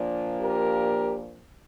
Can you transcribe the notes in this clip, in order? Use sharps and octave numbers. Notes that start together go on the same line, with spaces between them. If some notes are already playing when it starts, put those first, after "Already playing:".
Already playing: A#2 F3 A#3 D4
G4 A#4